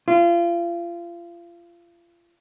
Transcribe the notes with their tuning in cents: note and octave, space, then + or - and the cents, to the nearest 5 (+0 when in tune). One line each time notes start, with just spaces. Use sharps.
F4 -30